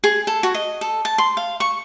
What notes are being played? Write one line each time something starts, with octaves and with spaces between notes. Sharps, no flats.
G#4
A4
F#4
D#5
A4
A5
C6
F5
C#6